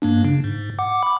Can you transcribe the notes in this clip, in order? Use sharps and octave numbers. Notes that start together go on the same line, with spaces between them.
G2 A#3 D4
C#3
G#2
F#5 D6
B5 D6